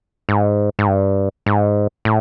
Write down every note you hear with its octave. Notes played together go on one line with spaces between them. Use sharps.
G#2
G#2
G2
G#2
A2